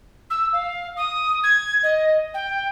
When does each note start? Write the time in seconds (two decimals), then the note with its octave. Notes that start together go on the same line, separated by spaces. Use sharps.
0.30 E6
0.53 F5
0.97 D#6
1.43 G#6
1.83 D#5
2.34 G5